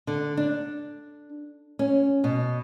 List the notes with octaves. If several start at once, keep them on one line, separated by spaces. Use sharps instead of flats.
D3
D4
C#4
B2